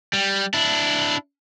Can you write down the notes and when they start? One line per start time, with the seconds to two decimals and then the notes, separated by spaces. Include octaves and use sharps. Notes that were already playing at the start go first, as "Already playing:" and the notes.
0.13 G3
0.54 D4 E4